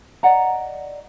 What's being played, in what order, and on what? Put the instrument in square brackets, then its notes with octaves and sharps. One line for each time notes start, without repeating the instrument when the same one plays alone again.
[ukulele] D5 D#5 F#5 A#5